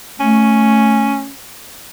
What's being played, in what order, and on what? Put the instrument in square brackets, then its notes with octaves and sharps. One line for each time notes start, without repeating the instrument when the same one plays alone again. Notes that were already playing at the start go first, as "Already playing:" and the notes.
[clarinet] A3 [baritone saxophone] C#4